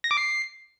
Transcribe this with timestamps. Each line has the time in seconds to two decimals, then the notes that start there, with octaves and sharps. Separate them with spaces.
0.04 A#6
0.11 D6
0.17 C7